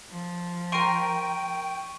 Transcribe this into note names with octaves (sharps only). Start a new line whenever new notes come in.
F3
A#4 G5 C6 C#6 D7 D#7